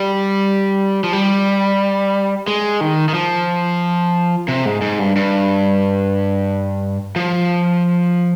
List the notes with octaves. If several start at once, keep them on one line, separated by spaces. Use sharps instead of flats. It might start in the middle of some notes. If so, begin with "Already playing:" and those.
Already playing: G3
F3
G3
G#3
D#3
D#3
F3
C3
G#2
G#2
G2
G2
F3